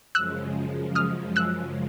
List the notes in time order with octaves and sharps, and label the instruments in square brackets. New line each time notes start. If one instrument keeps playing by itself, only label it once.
[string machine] F#2 C#3 F3 G#3 [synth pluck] E6 F#6
[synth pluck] D#6 F6
E6 F#6